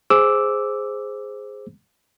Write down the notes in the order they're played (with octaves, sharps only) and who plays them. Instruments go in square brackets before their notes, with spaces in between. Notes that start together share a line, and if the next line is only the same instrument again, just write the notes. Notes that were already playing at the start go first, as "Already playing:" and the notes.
[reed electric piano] G#4 C5 D6 E6